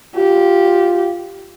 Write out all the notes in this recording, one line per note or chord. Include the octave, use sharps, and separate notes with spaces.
F4 G4